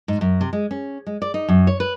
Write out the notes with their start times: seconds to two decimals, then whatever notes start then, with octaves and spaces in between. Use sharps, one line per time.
0.08 G#2
0.21 F#2
0.41 C3
0.53 G#3
0.71 C#4
1.07 G#3
1.22 D5
1.34 D#4
1.49 F#2
1.67 C#5
1.80 B4